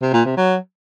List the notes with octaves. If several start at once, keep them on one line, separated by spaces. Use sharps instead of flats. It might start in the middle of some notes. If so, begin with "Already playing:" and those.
C3
A#2
C3
F#3